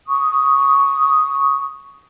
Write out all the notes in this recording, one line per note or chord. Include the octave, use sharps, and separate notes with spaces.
C#6 D#6